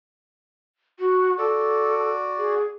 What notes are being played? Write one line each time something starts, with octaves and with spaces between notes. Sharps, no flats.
F#4
F#4 A4 D5
G#4